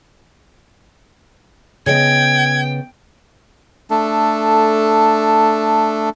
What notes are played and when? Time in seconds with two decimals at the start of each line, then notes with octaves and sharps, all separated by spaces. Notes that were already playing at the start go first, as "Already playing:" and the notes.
1.86 C#3 B3 D#5 G5 G#6
3.90 A3 D4 A4